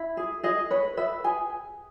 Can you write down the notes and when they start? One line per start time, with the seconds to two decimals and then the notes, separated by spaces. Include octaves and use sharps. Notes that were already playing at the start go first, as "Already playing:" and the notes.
Already playing: E4
0.17 G#4
0.43 G#4 D#5
0.70 B4 C#5
0.97 B4 E5
1.24 G#4 G#5